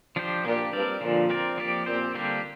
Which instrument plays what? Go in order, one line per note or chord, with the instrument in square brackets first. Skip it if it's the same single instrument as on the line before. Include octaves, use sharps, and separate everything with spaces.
[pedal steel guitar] F3 D4 G4 C5
[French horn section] A#2 [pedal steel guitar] A#3 D4 G4
[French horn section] G2 [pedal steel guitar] G3 C4 A#4 D5
[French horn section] A#2 [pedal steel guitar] D3 F3 D4
[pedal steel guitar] C4 A#4 D5
F3 A#3 G4 D5
[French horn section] A#2 [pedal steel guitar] C4 G4 C5
[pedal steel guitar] D3 G3 A#3 D4 G4